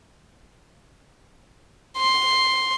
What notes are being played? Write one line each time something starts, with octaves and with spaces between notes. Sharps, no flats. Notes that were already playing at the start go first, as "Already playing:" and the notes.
C6